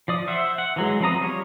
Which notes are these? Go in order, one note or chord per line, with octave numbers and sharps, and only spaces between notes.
F3 D5 D#6
C5 E5 F#5
F#5
E3 F#3 G#3
F3 B3 C4 A#5 D#6
G3 F4 C#5